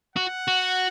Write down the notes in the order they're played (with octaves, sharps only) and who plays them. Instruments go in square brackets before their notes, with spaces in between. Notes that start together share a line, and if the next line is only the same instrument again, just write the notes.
[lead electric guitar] F#4 [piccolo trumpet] F#5
[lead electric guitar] F#4